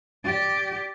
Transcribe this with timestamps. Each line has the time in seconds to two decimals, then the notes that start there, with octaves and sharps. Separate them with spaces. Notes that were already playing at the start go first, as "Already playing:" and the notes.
0.24 G4 D5